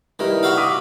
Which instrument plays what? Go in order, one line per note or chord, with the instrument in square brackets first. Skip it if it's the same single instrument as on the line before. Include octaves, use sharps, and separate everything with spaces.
[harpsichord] D#3 [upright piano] G3 E4 B4
[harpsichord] F#4 E5 F5
[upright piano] D6 D#6 B6